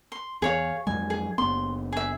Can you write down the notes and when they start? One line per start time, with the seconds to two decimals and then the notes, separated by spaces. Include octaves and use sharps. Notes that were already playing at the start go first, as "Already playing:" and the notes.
0.12 C6
0.42 E2 G#4 C#5 F5
0.87 F2 F#3 G#3 G#5
1.10 G#4
1.38 F#1 B3 C6
1.93 G#4 E5